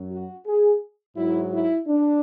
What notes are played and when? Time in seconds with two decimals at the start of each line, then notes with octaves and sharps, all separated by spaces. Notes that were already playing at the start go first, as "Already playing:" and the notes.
Already playing: F#2 F#3
0.11 F#4
0.47 G#4
1.17 G#2 F#3 E4
1.52 E4
1.87 D4